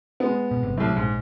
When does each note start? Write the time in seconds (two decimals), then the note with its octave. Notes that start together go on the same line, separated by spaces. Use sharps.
0.20 G#3 B3
0.51 B2
0.63 G1 C3
0.77 C2 A2 F#3
0.96 A#1 G#2